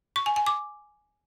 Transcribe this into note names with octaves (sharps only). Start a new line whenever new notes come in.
C#6
G#5
G#5
D6